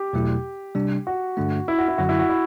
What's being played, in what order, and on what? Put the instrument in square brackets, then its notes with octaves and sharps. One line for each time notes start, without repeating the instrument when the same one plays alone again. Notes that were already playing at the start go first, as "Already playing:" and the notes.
Already playing: [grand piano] G4
[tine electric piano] E2 B2 F#3 A3 E4
C3 G3 D4
[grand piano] F#4
[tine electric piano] G2 D3 A3 D4
[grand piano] E4
F#4
E4
[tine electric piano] F#2 D3 F#3 [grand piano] F#4
[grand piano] E4
F#4
E4